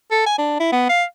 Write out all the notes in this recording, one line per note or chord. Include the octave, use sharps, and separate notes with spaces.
A4
G#5
D4
E4
B3
F5